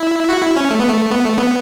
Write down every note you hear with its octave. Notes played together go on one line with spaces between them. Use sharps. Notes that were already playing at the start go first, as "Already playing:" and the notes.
Already playing: E4
F#4
E4
C#4
A3
B3
A3
B3
A3
B3